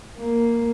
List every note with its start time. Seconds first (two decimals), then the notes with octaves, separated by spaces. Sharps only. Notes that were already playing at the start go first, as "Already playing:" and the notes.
0.18 A#3